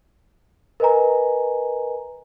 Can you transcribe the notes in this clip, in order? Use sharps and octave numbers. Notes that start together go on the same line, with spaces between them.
A#4 B4 D#5 G#5 A#5